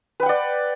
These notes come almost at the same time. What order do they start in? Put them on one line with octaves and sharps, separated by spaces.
B4 G5 F#5 D5